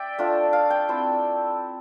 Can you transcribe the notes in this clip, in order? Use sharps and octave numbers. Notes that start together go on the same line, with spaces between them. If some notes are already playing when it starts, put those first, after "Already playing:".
Already playing: D5 E5 G5
A3 D4 F4
F5
G5
A3 C4 E4